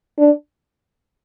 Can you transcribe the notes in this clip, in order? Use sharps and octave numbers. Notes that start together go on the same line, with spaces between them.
D4